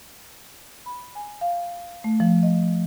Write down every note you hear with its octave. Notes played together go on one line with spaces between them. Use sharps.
B5
G#5
F5
A3
F3
D#5